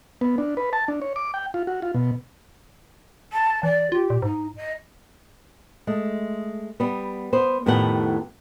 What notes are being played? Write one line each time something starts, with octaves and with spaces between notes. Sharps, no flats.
B3
D4
B4
A5
D4
C#5
D6
G5
F4
F#4
F4
B2
A5
E3 D5
F4 G4
A#2
G#2 D#4
D#5
G#3 A3
G3 B3
B3 C5
F2 A2 D#3 B3 G4 F#5